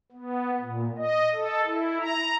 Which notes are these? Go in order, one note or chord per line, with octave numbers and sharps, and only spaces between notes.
B3
A#2
D#5
A4
E4
A#5